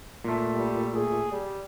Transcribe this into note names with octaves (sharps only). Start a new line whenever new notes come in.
A#2 A3
G3
G#4
G3